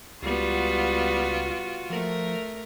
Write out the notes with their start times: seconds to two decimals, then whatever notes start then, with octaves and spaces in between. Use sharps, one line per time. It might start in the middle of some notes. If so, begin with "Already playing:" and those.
0.22 C#2 G3 B3 F4 F#4
1.90 F3 A3 A#4